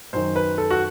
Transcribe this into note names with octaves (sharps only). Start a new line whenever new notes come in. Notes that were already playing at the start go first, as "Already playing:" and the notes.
F#2 D#3 C5
B4
A4
F#4